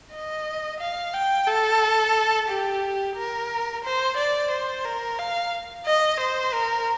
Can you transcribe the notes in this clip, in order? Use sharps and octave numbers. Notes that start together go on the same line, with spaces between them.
D#5
F5
G5
A4
G4
A#4
C5
D5
C5
A#4
F5
D#5
C5
A#4